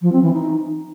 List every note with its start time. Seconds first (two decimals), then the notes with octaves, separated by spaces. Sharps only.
0.02 F3
0.12 C4
0.23 E3
0.33 D#4